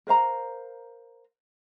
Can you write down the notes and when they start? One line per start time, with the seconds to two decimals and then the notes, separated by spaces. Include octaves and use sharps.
0.07 A#4 C5 F5 A#5